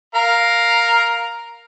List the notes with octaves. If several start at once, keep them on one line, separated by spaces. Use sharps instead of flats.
A#4 F5 A#5